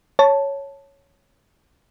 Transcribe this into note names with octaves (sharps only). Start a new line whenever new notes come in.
C#5 A5